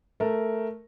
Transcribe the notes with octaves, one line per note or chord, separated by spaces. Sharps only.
A3 A#4